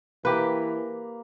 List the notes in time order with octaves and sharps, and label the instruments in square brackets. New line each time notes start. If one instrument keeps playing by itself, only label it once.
[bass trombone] E3 [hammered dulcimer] A#3 [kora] G4 B4